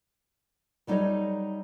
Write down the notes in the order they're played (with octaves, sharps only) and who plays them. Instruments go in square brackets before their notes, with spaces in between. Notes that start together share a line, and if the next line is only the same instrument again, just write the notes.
[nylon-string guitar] F#3 G3 D#4 A4 C#5 D#5